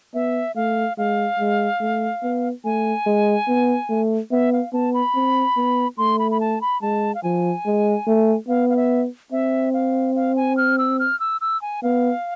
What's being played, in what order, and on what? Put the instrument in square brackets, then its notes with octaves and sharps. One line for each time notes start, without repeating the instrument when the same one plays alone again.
[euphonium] B3 [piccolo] E5
[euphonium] A3 [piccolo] F5
[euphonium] G#3 [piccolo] F5
[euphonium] G#3
A3
B3
[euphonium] A3 [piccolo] G#5
[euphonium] G#3
B3
A3
[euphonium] B3 [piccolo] E5
[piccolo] F5
[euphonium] B3 [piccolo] A5
[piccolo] B5
[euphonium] C4
B3
[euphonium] A3 [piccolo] C6
[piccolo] B5
B5
A5
B5
[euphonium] G#3 [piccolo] A5
[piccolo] F5
[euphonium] F3 [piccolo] G#5
[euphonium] G#3
A3
[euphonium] B3 [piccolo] F5
[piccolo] F5
E5
[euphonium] C4 [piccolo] E5
[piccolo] F5
F5
G#5
F6
E6
F6
E6
E6
G#5
[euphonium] B3 [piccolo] F5